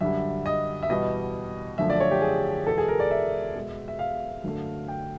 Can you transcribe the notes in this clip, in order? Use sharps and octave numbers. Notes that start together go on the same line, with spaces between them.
F#2 D3 G3 E5
D#5
E5
E2 B2 G3 D#5
F#2 D3 F3 A3 E5
D5
C#5
G4
G#4
E2 B2 G#3 A4
G#4
A#4
D5
E5
B2 G#3
E5
F5
F#2 D3 F#3 A3
G5